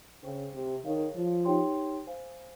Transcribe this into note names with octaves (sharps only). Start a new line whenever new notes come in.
C#3 C5 G5 C#6
C3
D#3 G#4 C#5 F5
F3
D#4 G4 C#5 G5 C6
C5 F5 G#5